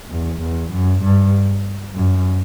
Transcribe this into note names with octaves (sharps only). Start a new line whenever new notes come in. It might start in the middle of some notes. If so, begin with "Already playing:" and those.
E2
E2
F#2
G2
F#2